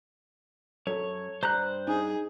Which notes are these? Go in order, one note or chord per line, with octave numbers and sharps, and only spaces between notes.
F#2 A4 C#5
G2 G3 C5 A#5 F#6
D#4 G#4